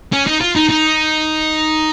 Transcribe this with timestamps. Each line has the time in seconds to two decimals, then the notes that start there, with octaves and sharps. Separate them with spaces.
0.12 C#4
0.27 D#4
0.41 F4
0.55 D#4
0.70 D#4